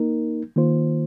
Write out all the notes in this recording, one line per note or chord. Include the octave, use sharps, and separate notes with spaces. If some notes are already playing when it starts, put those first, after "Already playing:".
Already playing: A#3 D#4 A#4
D#3 A#3 F4 C5